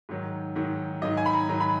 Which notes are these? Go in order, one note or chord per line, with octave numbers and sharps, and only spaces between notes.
G#2 D#3 F#3
G#2 D#3 F#3
G#2 D#3 F#3 D#5
G#5
B5
A#5
G#2 D#3 F#3 A#5
B5